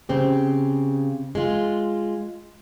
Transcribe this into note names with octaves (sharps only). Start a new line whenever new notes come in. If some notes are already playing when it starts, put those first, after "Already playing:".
C#3 C4 G4
G#3 F4